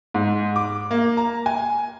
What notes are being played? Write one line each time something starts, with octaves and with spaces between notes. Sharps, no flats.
G#2
D6
A#3
A#5
G#5